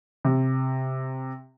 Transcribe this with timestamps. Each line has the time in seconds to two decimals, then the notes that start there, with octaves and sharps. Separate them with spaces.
0.25 C3